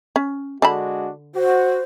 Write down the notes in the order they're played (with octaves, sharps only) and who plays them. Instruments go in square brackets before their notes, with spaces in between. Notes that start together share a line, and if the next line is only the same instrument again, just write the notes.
[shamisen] C#4
[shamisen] D3 A5 B5 [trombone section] G#3 D4 F#4
[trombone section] F#4 [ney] C5